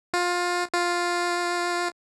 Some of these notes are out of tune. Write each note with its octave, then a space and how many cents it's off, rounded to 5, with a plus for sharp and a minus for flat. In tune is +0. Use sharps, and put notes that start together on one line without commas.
F4 +20
F4 +5